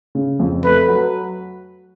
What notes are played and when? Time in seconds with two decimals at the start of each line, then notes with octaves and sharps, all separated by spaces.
0.15 C#3
0.40 F2
0.64 A3 B4
0.88 F#3